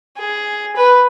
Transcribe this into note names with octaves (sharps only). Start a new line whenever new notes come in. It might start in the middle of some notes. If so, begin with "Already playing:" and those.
G#4
B4